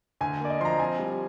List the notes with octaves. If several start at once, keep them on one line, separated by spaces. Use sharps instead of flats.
D2 G#5
A#3 D5
D#5
F3 A#5 C6
C4 G#5
G3